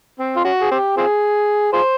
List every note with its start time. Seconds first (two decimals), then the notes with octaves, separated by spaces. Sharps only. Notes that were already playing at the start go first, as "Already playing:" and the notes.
0.19 C4
0.36 F4
0.44 C#4 F#4
0.61 G#4
0.71 C4 G4
0.97 C4 F4 G#4
1.73 F4 G#4 C5